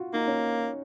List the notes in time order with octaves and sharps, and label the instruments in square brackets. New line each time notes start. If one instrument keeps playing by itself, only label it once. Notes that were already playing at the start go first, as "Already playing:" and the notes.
Already playing: [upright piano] F4 F#4
[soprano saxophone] A#3 [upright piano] D#4
[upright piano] C#4